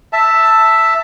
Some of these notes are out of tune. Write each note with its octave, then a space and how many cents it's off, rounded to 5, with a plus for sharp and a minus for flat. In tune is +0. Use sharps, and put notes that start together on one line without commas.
E5 +0 A5 +10